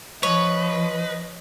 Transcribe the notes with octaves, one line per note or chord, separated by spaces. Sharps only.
F3 B4 C#5 D#5